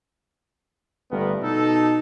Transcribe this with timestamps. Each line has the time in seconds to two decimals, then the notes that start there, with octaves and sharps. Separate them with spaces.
1.12 G1 G2 A3 B3 A#4
1.43 B2 D#4 A4